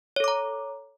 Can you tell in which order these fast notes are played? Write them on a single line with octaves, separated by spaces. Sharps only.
C#5 A4 D6 A#5